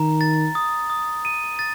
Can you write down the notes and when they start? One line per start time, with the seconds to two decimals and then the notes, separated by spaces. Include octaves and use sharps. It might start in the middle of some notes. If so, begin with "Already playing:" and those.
Already playing: D#3 A#5
0.21 A6
0.55 D#6
0.90 D#6
1.25 D#7
1.59 A6